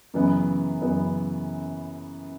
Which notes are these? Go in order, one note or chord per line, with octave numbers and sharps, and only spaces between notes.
F#2 C#3 E3 B3
F#2 C#3 E3 B3